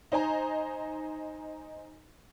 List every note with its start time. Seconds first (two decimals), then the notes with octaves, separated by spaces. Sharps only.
0.12 D#4 C5 D#5 G#5 A#5